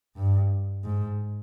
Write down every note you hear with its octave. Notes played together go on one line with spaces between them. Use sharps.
G2
G#2